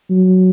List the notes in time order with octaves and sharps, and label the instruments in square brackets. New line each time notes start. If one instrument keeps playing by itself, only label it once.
[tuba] F#3